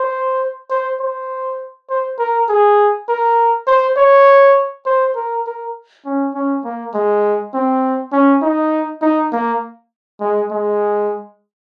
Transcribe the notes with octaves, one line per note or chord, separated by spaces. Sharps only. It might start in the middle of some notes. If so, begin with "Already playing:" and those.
Already playing: C5
C5
C5
C5
A#4
G#4
A#4
C5
C#5
C5
A#4
A#4
C#4
C#4
A#3
G#3
C4
C#4
D#4
D#4
A#3
G#3
G#3